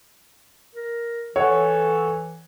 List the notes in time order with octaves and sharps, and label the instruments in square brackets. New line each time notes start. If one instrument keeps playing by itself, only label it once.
[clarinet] A#4
[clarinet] E3 [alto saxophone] A4 [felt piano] C#5 F#5